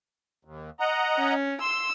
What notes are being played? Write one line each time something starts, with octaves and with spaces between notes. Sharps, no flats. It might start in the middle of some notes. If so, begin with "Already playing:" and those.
D#2
D#5 F#5 A#5
C#4
C6 E6